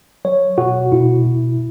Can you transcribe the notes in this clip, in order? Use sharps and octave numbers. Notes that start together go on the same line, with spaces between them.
F#3 C#5
B2 F#4
B2 E4
B2